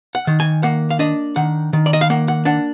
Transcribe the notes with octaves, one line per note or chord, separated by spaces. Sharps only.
F#5
D#3
G#5
A#3 F#5
F5
D4 D#5
D#3 F#5
D#3
D5
D#5
F5
A#3 F#5
F#5
D4 F#5